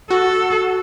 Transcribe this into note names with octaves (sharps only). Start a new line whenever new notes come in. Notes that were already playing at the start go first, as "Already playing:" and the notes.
F#4 A4